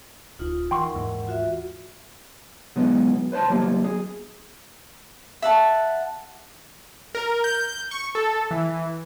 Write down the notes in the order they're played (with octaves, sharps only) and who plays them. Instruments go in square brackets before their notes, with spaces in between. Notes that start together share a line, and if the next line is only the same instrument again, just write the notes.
[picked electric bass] D1 [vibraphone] D#4 F4
[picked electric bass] E3 [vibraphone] A#4 F#5 [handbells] G5 C6 C#6
[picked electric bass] D#2 G#2 E3
[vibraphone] F4 F#4 E5
[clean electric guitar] B2 F#3 G#3 B3
B4 C5 E5 A5 C6
F#3 G3 A#3
G#4
[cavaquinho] E5 F#5 A5
[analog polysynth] A#4
G6
C#6
A4
E3